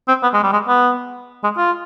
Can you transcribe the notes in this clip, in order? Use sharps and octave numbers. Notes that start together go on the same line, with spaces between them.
C4
B3
G#3
G3
G#3
B3
G#3
F4